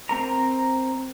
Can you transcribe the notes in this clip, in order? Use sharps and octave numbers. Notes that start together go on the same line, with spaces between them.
C4 A#4 A#5